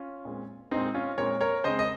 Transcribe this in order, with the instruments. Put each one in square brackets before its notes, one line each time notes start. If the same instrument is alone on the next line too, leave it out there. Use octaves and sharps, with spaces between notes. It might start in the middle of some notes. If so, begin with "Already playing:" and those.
Already playing: [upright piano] C#4 F4
A#2 G#3 C4
A#2 G#3 C4 D#4
C#4 F4
A#2 G#3 C4 A#4 C#5
A#4 C#5
C#3 G#3 C4 C5 D#5
D#5